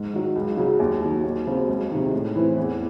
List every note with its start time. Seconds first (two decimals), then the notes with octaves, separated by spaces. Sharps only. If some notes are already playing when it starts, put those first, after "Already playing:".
Already playing: G#2
0.13 D#3 F#3
0.36 C#2
0.57 C#3 F#3
0.80 D#2
1.01 D#3 F#3
1.24 D#2
1.46 C#3 F#3 C4
1.68 C#2
1.91 C3 D#3
2.13 A2
2.35 E3 C4 E4
2.58 E2